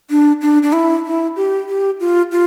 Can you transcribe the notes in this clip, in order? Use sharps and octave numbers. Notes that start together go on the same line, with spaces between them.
D4
D4
D4
E4
E4
G4
G4
F4
F4